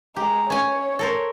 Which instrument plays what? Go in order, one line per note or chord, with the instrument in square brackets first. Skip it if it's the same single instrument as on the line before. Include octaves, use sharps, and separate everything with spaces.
[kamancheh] G#3 A#5 [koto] G4
[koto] C#4 G#5 [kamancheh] C#5
[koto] A4 A#4 C5